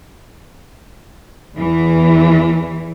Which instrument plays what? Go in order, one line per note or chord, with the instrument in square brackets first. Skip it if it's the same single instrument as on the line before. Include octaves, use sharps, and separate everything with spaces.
[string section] E2 E3